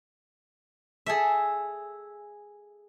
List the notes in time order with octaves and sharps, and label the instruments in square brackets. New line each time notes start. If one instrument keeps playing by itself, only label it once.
[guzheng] G#4 A4 E5